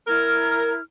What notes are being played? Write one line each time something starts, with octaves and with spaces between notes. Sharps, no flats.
E4 A#4 F6 G#6